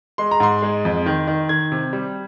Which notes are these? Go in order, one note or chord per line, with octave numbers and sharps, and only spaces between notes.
G#3 C6
A#5
G#2 C6
G#3
F2
D#3
D#3
D#3 G#6
C3
G3